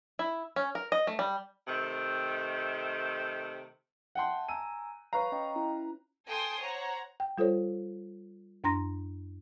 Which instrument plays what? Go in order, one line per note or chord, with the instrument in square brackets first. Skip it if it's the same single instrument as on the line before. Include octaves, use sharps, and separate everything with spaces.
[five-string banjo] E4
C#4
A#4
D#5
A3
G3
[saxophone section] C3 D#3 A3
[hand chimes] E5 A5 [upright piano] F#5 G5 C6
[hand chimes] G#5 A#5 E6 [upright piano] D#7
[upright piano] B4 F5 A#5 [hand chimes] C#5 C#6 C7
[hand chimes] C#4 D#5 G5
C#4 E4
[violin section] A4 G5 G#5 C6 D#6
C5 C#5 F#5 A#5
[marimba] G5
G3 F4 A4 C5 C#5
F#2 D4 A#5 C6 A#6